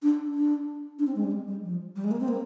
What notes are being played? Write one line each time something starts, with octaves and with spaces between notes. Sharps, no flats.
D4
D4
D4
C4
G#3
G3
G#3
G3
F3
G3
G#3
A#3
C4
A#3